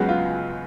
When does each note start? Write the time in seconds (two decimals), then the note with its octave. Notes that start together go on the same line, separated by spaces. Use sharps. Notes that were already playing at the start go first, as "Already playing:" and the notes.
Already playing: C#2 C#3 F#3 G#3 B3 F#4
0.09 F4